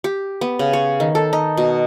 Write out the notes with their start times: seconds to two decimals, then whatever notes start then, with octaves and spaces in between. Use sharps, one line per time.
0.04 G4
0.41 B3
0.59 C#3
0.73 C#5
1.00 D#3
1.15 A4
1.33 D#4
1.57 B2